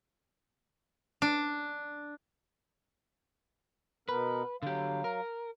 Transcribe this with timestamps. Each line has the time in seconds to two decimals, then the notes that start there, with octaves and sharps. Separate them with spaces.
1.22 D4
4.09 B2 B3 A#4 B4
4.63 D3 F#3 G4 F5
5.04 A#4